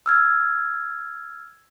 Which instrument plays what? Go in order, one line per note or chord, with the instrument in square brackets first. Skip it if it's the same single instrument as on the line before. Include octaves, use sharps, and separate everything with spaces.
[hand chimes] E6 F6 G#6